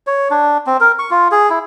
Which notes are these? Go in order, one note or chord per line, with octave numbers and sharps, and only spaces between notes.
C#5
D4
C4
A#4
C#6
F4
G#4
E4